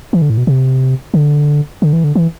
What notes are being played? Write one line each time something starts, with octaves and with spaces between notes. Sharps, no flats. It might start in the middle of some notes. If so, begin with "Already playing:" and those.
E3
D3
A2
B2
C3
D3
D3
E3
D3
E3